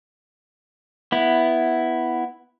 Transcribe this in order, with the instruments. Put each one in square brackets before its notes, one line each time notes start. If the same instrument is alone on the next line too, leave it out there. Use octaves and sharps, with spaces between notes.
[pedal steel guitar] B3 E4